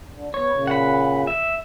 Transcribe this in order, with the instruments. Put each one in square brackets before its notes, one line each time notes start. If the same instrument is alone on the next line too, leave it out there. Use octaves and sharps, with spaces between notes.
[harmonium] D3
[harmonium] B3 [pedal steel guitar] C#5
[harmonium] A#2 C#3
[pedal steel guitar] F#5 B5
E5